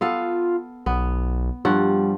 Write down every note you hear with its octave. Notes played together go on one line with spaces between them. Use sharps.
B3 F4 A4 F5
B1 B3
G2 F3 G3 F#5